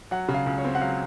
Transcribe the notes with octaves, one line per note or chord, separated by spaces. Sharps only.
F#3 F#5
C#3
F5
C#2
C#5
C4
F#5
F#3 F5